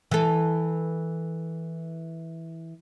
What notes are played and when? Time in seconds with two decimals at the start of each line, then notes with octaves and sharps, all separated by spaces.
0.11 E3 A4